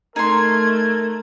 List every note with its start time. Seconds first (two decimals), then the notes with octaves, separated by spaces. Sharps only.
0.16 A3 D#4 A#4 C6 G#6